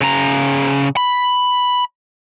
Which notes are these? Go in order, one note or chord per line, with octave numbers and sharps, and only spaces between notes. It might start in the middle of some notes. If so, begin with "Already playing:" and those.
C#3 A#5
B5